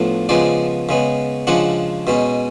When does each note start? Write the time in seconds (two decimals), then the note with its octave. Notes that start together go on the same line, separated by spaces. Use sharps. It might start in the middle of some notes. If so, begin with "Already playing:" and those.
Already playing: A2 F3 B3 D4
0.29 C#3 F3 G#3 B3 D5
0.89 C#3 G#3 B3
1.47 C#3 F3 G#3 D4 F#5
2.07 B2 G#3 C#4